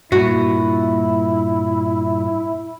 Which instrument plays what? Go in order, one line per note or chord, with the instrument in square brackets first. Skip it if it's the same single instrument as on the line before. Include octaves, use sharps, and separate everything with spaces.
[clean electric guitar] G2 A#2 [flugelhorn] E4 [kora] F#4